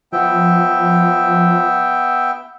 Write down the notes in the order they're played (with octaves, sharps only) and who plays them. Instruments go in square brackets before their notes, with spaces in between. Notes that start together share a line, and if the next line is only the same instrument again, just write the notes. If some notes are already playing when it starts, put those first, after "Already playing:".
[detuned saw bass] F3 [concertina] B3 E5 G5